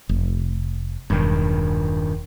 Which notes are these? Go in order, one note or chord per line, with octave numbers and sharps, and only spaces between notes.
F1
E1 G2 D#3